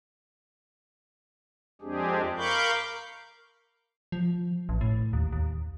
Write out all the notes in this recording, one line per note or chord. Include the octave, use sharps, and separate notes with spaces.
F2 G#3 C4 D4 G4 G#4
A#4 F5 B5 C#6 D6 G6
F3
A1
A2
D#2
D#2